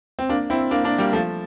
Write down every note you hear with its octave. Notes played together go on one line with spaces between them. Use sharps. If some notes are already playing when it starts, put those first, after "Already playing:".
C4
A#3 D4
C4 E4
A#3 D4
A#3 D4
G3 A#3
F3 A3